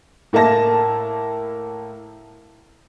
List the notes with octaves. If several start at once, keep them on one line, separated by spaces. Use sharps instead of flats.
A2 A#3 E4 A5 A#6